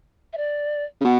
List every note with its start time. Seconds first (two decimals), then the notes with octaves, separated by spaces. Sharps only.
0.33 E5
0.37 D5
1.01 C#3
1.04 B2 F#5